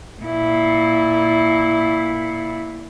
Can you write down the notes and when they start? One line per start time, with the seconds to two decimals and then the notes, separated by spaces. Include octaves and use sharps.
0.22 A#2 E4